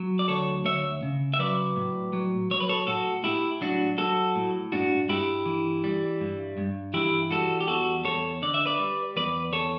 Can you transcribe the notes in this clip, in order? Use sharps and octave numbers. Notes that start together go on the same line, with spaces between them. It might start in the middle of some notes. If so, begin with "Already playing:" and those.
Already playing: F#3
D5
D2 A4 C#5
D2 C#5 E5
C#3
E5
F#3 B4 D5
A2
F#3
F#3 C#5
B4
A4 C#5
A2 F#4 A4
A2 E4 G4
F#3 D4 F#4
F#3 F#4 A4
A2
G2 D4 F#4
G2 E4 G4
E3
G3
G2
G2
E3 E4 G4
G3 F#4 A4
G4
E2 F#4 A4
E2 A4 C#5
D3 D5
E5
B4 D5
G3
E2 B4 D5
E2 A4 C#5